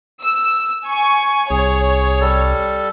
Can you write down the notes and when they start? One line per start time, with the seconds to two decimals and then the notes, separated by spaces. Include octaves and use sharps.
0.22 E6
0.88 G#5 C#6
1.50 C2 G#4 C#5
2.21 G3 A4